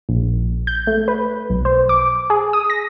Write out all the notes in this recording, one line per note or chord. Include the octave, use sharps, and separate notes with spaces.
A#1
G6
A3
B4
B1
C5
D6
G#4
D#6
A#6